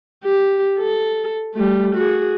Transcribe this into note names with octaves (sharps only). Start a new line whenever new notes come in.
G4
A4
G3 A3
F#4 G#4